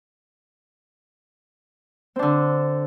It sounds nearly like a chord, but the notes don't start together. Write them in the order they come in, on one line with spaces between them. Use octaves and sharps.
C4 D4 D3